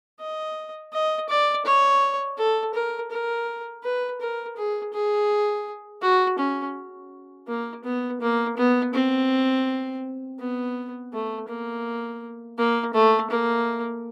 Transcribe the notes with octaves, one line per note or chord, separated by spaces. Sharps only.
D#5
D#5
D5
C#5
A4
A#4
A#4
B4
A#4
G#4
G#4
F#4
C#4
A#3
B3
A#3
B3
C4
B3
A3
A#3
A#3
A3
A#3